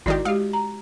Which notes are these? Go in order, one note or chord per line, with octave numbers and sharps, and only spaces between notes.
G#1 D#3 E4 F#4 G4 D5
G#3 G4 F5
A#5